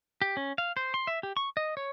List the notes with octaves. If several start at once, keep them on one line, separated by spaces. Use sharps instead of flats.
G4
C#4
F5
C5
C6
E5
G4
C#6
D#5
C#5